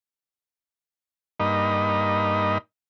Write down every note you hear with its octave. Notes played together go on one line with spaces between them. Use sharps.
G2 A#3 D#4 D#5 B5